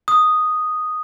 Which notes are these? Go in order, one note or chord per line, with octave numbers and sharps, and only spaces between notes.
D#6